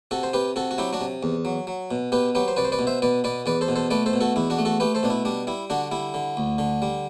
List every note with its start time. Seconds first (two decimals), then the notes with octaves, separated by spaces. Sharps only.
0.11 C3 F#4 A4
0.23 C5
0.33 C3 G4 B4
0.56 C3 F#4 A4
0.71 F#4
0.78 F#3 E4 G4
0.93 D4 F#4
1.01 C3
1.23 E2
1.45 F#3
1.67 F#3
1.91 B2
2.12 B2 G4 B4
2.35 F#3 G4 B4
2.48 C5
2.56 C2 B4 D5
2.65 C5
2.72 B4 D5
2.79 B2
2.87 C5 E5
3.02 B2 B4 D5
3.24 B2 B4 D5
3.46 E2 B4 D5
3.61 A4 C5
3.68 B2
3.76 A4 C5
3.90 A3 B4 D5
4.06 A4 C5
4.13 B2
4.21 F#4 A4
4.36 E2 E4
4.50 D4 F#4
4.59 A3
4.65 F#4 A4
4.80 A3 G4 B4
4.95 A4 C5
5.03 B2 D4
5.10 E4
5.25 G3 D4
5.47 G3 E4
5.70 D3 D4 F#4
5.91 G3 E4
6.14 D3
6.37 D2
6.58 D3
6.82 G3